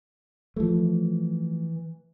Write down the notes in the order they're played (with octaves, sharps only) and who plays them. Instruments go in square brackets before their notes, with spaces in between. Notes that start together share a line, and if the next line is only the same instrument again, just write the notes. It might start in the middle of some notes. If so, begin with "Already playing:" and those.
[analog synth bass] E3 [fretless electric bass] F3 A3